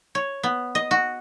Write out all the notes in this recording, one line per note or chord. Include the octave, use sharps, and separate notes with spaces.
C#5
B3
D#5
F#4